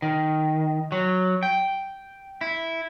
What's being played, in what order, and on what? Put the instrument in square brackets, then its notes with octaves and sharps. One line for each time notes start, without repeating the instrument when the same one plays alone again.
[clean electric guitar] D#3
F#3
G5
E4